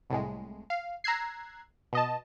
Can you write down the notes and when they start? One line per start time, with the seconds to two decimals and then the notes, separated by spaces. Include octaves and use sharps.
0.10 C2 A2 G#3
0.70 F5
1.04 A#5 E6 F#6 G#6 C7
1.93 B2 D#5 A5